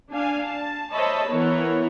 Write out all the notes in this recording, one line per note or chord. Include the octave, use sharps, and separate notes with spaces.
D4 F5 G#5
A5
C5 C#5 D#5 E5 A5 B5
E3 B3 A#4 C#5